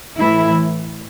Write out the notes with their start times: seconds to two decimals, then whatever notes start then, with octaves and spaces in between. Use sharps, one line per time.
0.16 A2 E3 A3 E4